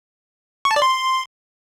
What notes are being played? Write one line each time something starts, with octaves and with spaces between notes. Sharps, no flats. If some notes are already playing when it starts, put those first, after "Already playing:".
C#6
A5
D5
C6